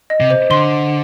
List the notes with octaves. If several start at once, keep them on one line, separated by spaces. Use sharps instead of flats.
D#5
C3
C5
D3 C6